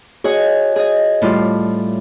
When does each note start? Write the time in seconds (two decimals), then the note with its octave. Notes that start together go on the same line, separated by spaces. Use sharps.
0.24 F#4 G#4 C#5 D#5 G#5
0.76 G#4 D#5
1.22 A2 G3 F4